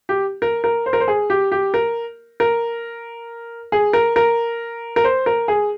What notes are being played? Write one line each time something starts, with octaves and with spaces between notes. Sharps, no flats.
G4
A#4
A#4
C5
A#4
C5
G#4
G4
G4
A#4
A#4
G#4
A#4
A#4
A#4
C5
A#4
G#4